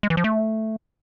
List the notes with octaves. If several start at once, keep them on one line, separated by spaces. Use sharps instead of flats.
G#3
E3
F3
A3